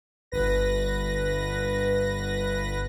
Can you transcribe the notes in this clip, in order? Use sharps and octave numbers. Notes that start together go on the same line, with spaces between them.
G1 B4 A#6